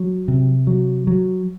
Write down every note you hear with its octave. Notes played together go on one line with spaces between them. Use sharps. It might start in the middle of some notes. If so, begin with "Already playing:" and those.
Already playing: F#3
C3
F#3
F#3